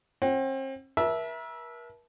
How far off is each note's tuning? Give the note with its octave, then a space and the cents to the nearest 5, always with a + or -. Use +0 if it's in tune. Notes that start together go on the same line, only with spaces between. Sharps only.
C4 +40 F#5 +40
A#4 +45 E5 -5 A5 -20